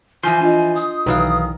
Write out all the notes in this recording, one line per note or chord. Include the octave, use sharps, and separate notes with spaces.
E3 F3 G#5 C6 F6 G6 C7
D4 F4 D#5
D#6
B1 D#3 E3 F5